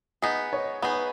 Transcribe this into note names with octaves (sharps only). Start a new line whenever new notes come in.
B3 D#4 G#4 D#5
C#5
B3 D#4 G#4 B4